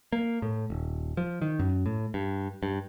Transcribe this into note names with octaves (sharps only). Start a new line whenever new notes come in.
A#3
A2
D#1
F3
D#3
F#2
A2
G2
G2